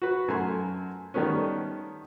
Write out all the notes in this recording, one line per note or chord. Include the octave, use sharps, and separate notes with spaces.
F#4 B4
F#2 A3 G#5 C6
D#3 G3 A3 B3 C#4